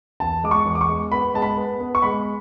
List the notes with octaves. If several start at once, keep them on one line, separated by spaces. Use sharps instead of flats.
E2 A5
G#3 D6
C#6
E2
D6
C#6
G#3
B3 B5
G#3 A5
B5
B3
B3
C#6
G#3 B5